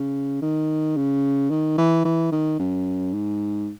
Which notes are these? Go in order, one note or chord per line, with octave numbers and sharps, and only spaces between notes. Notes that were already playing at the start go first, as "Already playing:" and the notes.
Already playing: C#3
D#3
C#3
D#3
E3
E3
D#3
F#2
G#2